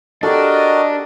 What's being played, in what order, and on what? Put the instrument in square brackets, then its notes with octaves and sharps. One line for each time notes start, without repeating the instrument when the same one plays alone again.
[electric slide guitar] D4 [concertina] F#4 A#4 [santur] G4 A4 [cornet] D#5